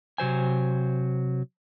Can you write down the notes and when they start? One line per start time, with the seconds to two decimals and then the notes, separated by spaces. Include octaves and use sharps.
0.18 C3 F#3 C5 G#5